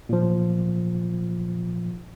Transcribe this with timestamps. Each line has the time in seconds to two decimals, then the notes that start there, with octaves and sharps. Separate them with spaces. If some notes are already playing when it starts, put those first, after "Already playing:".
0.09 A#2 F3